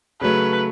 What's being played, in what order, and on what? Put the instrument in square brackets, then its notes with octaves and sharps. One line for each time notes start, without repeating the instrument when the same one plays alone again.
[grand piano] C#3 F#3 A3 [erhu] B4